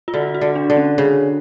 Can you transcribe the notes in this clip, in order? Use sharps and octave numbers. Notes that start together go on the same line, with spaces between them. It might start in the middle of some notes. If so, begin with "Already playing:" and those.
F4
D3 F#4
F#4
D3
D4
D3
C#4
C#3